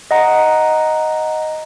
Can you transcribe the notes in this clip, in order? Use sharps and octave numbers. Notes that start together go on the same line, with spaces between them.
D#5 F#5 A#5